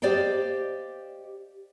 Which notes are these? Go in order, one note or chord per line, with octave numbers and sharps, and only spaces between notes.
G4 C5 D5 D#5 F5 G5